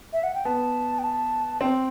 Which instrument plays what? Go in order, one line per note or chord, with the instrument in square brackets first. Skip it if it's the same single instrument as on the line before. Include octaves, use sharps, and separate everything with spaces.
[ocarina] E5
F#5
G5
[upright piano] B3 [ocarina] A5
[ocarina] G5
A5
[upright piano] C4 [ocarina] G5